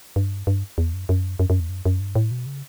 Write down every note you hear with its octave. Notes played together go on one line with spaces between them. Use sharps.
G2
G2
E2
F#2
F#2
F#2
F#2
E2
F#2
F#2
G2
A2
B2
C#3